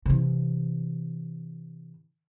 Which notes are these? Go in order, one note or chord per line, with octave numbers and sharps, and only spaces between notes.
C3 E3